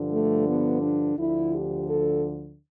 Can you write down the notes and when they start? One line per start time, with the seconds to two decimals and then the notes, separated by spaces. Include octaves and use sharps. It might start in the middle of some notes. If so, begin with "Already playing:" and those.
Already playing: G2 D3 F3
0.13 A3
0.47 B3
0.82 D4
1.17 D2 D3 F3 E4
1.53 G4
1.88 A4